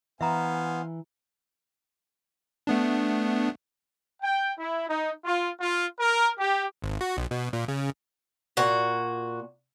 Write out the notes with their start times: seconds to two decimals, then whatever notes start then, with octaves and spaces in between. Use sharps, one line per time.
0.21 E3 B3 C5 E5 F5 G#5 A#5
2.67 A3 B3 D4
4.22 G5
4.58 E4
4.89 D#4
5.25 F4
5.61 F4
6.00 A#4
6.38 G4
6.82 G#1
7.01 F#4
7.17 B1
7.31 B2
7.53 A#2
7.68 C#3
8.57 A#2 F#4